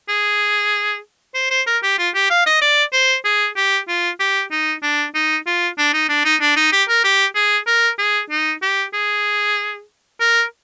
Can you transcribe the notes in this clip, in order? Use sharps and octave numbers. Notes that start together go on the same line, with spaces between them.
G#4
C5
C5
A#4
G4
F4
G4
F5
D#5
D5
C5
G#4
G4
F4
G4
D#4
D4
D#4
F4
D4
D#4
D4
D#4
D4
D#4
G4
A#4
G4
G#4
A#4
G#4
D#4
G4
G#4
A#4